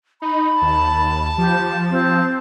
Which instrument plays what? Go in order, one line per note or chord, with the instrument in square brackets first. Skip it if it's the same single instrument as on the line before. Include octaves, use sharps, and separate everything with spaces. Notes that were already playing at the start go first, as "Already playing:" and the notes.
[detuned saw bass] D#4 [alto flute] B5
[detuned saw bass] D#2 [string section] A5
[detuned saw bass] F3 [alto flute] G4
[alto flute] C4